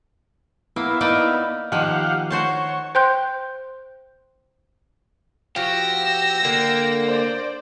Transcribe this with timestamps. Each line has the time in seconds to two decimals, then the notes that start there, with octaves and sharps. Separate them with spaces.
0.76 A#3 B3 E4
1.01 A#3 D#4 D5
1.72 D#3 F3 G4 F5 F#5
2.30 F#4 C5 C#5 A5
2.95 C5 G5 C6 F#6 G6
5.56 F3 F#4 G4 E6 A#6
6.45 D3 A#3 G5
7.06 C5 D5